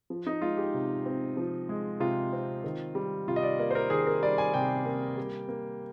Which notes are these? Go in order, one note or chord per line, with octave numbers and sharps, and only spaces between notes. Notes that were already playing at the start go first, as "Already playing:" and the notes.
F3
D#4
G#3 F4
G4
C3
C4
F3
G#3
C3 F4
C4
D#3
G3
C3 F4
D#5
D5
A#3 D5
C5
A#4
D#3 G#4
A#4
G3 D5
G#5
C3 G5
A#3
G3
A#3